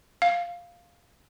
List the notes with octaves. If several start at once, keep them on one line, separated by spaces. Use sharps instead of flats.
F5